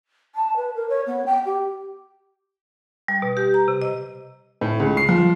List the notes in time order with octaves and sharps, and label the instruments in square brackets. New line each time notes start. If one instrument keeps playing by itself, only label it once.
[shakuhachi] A5
B4
A#4
C#5
B3
G5
G4
[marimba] G3
B2
G4
A#5
C3
D#5
[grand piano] A2
C#2
C7
F3